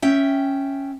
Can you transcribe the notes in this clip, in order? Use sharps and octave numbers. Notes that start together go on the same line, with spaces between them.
C#4 E5 G5